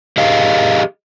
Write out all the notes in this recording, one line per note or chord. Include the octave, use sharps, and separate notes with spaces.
G4 G#4 D#5 F5